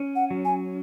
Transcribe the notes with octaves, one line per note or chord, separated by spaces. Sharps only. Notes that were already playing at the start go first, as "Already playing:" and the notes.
Already playing: C#4
F#5
F#3
G#5